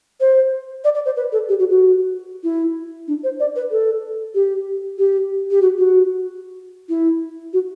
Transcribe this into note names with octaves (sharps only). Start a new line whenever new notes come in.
C5
D5
D5
C5
B4
A4
G4
F#4
F#4
E4
D4
C5
D5
B4
A4
G4
G4
G4
F#4
F#4
E4
F#4